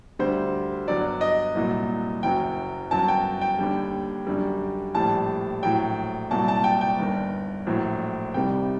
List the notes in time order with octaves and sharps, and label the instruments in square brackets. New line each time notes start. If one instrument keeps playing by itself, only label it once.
[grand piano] D2 D3 G3 C5
G1 G2 F#3 D5
D#5
C2 A#2 F#3
F#1 F#2 F#3 G5
G1 F#2 F#3 A5
G5
G5
D#2 D3 G3
F#2 D3 G3
A#1 A2 G3 A5
A#1 A2 F#3 G5
C2 A#2 F#3 A5
A5
G5
G5
G1 G2 D#3
A#1 A2 F#3
C2 C3 D#3 G3 G5